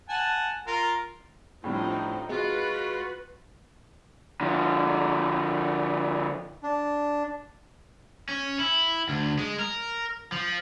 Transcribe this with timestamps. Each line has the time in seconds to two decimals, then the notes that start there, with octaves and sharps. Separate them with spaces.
0.09 F#5 G#5 A5
0.67 F4 A#4 F5
1.64 A2 F3 G3 C4 D4 D#4
2.29 G#3 F4 F#4 B4
4.41 D3 F3
6.63 D4
8.29 C#4
8.59 E4
9.09 D2
9.39 G#3
9.59 A#4
10.32 F3